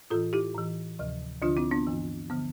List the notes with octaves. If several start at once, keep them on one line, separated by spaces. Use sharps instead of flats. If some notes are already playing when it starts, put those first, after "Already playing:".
A2 E3 F4 A4
E4 G4
A2 E3
D2 C3 F3
D2 D3 F3 D4 F4
C4 E4
B3 D4
G2 E3
D3 F3 B3